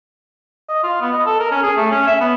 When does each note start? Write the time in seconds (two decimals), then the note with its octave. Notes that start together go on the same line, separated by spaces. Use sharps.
0.69 D#5
0.83 F4
1.01 B3
1.13 D#5
1.26 A4
1.39 A#4
1.51 C#4
1.63 G#4
1.76 A3
1.92 C#4
2.07 E5
2.21 B3